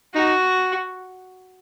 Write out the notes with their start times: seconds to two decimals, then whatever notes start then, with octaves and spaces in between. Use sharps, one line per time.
0.14 D#4 F#4